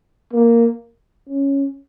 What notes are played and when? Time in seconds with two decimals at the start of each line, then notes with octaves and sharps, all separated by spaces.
0.33 A#3
1.29 C#4